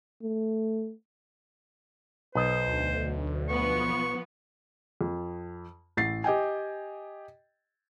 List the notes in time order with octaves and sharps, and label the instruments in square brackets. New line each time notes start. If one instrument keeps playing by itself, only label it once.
[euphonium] A3
[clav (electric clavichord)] B1 D#5 [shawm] C5
[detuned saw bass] D2
[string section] F3 B3 [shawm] C#6
[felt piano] F2
A1 A6 C7
G4 D#5 G5 G#5